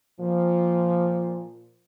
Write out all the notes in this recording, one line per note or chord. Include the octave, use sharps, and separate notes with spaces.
A#2 F3